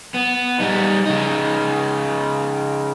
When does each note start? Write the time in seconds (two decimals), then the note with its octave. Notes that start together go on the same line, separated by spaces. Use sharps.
0.14 B3
0.60 G3 D#4
1.06 C#3 D#4